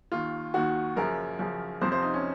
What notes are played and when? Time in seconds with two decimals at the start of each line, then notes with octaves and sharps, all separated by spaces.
0.12 D#2 D#3 F4
0.54 D#2 D#3 F#4
0.96 F#2 C#3 F3 A#4
1.39 F#2 C#3 F3
1.81 F2 C3 F3 C5
1.92 C5
2.03 D#4
2.14 C#4